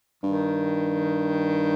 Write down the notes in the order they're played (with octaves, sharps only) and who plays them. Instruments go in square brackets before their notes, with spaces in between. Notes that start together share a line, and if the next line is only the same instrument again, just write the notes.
[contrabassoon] G2 [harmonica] D#3